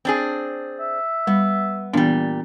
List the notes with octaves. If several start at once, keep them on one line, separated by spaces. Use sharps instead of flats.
C4 D4 G#4
E5
G3 B3
A#2 E3 G3 B3 D4